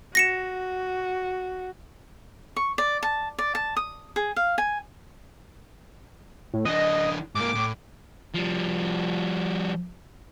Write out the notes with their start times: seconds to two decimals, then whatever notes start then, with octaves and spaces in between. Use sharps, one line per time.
0.15 F#4 A#6 C#7 E7
2.56 C#6
2.78 D5
3.03 A5
3.39 D5
3.55 A5
3.77 D#6
4.16 G#4
4.36 F5
4.58 G#5
6.54 A2
6.65 E3 D4 D#5
7.35 G#2 A#3 D6
7.55 A2
8.35 F3 G3